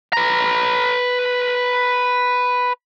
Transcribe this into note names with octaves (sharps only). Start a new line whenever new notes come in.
B4 A#5